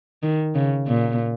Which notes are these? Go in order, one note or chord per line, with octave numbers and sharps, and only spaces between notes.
D#3
C#3
A#2